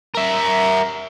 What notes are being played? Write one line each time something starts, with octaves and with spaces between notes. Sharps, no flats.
A#4 E5